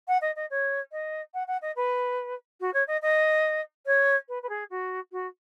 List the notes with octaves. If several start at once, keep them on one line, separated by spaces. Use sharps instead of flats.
F#5
D#5
D#5
C#5
D#5
F#5
F#5
D#5
B4
F#4
C#5
D#5
D#5
C#5
B4
B4
G#4
F#4
F#4